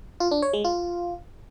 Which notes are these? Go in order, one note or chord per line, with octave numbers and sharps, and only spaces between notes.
F4
D4
C#5
G#3
F4